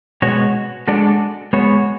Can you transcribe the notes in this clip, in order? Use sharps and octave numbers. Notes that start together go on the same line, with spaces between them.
B2 G#3 B3 F#4 C#5
G#3 D4 F#4 A4 D5
G#3 B3 F#4 C#5